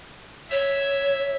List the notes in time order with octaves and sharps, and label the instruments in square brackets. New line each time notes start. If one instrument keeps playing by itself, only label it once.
[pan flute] C#5 [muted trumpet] E5